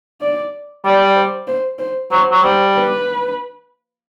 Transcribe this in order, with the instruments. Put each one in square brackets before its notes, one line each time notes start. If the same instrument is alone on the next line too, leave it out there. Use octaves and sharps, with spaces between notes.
[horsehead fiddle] D5
[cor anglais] G3 [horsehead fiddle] D5
[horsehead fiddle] C5
C5
C5
[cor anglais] F#3 [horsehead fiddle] C5
[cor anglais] F#3
[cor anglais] G3 [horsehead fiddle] C5
[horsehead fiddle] B4